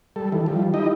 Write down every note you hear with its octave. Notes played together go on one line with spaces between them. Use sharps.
G3 A4
D#3 E3
F3 G3
D#4 E4 G4 D#5